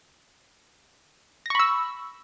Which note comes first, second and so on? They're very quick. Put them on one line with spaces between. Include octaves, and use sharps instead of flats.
A#6 C#6 B5 E6